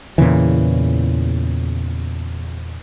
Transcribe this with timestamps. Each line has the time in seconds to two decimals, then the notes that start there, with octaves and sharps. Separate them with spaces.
0.18 E2 A#2 C#3 E3